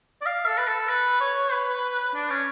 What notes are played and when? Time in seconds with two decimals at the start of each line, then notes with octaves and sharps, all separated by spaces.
0.22 D5
0.26 F5
0.46 A4
0.57 B4
0.67 A4
0.89 B4
1.21 C#5
1.51 B4
2.14 D4
2.30 C#4